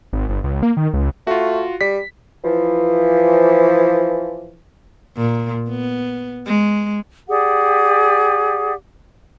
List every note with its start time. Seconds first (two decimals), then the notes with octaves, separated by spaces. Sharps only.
0.13 G#1
0.29 G1
0.44 C#2
0.62 A#3
0.77 D#3
0.93 C#2
1.27 A3 F4 F#4
1.81 G3 B6
2.44 E3 F3
5.17 A#2
5.69 B3
6.46 G#3
7.29 G4 G#4 D5 F#5